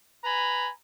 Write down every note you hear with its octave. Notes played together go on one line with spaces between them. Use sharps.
B4 G#5 A#5 B5